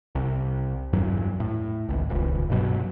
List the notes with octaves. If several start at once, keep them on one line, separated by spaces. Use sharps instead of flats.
C2
E2 G2 F#3
A2
G#1 C#2
D#1 C#2
G2 B2 F#3